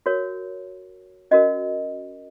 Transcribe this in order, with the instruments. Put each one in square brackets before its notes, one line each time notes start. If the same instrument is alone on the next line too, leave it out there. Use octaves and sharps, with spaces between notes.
[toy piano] F#4 A#4 C#5
C#4 F#4 A#4 D#5